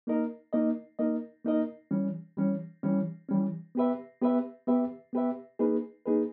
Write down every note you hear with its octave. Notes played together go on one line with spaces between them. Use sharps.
A#3 D#4 A#4 D#5
A#3 D#4 A#4 D#5
A#3 D#4 A#4 D#5
A#3 D#4 A#4 D#5
E3 G3 C#4
E3 G3 C#4
E3 G3 C#4
E3 G3 C#4
B3 G4 B4 E5
B3 G4 B4 E5
B3 G4 B4 E5
B3 G4 B4 E5
A#3 D#4 G#4 B4
A#3 D#4 G#4 B4